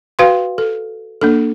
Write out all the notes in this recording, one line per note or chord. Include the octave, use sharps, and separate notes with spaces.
F#4 B4 F5 G5 C6
A4
A#3 D4 A4